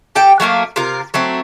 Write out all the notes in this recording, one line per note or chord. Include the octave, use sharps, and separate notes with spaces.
G4 A4 G5
F#3 A3 A#3 F5
C3 F4 A#4
F#3 A3 C4